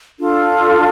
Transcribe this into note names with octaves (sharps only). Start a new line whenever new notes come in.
D4 F4 A4